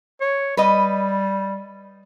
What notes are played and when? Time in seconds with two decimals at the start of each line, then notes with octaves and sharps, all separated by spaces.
0.21 C#5
0.57 G3 B4 D#5